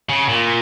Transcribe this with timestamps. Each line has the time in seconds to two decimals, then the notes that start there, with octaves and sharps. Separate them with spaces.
0.09 C#3
0.29 A#2